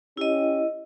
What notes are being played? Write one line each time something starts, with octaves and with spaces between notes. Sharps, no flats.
C#4 E4 G4 D#5